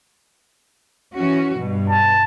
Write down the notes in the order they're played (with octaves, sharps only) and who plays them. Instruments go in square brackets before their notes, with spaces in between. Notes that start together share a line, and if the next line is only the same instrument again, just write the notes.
[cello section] E3 C#4 F#4
G2 B2
[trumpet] A5